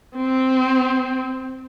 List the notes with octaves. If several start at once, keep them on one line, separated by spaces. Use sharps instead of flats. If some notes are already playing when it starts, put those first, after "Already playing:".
C4